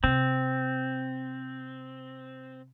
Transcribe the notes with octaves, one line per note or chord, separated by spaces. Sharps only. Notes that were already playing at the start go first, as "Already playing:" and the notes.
C3 C4